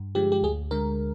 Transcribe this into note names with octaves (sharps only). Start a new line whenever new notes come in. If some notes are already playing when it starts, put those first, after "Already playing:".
Already playing: G2
D3 F3 G#3 G4
G4
D2 G#4
D3 G#3 A#4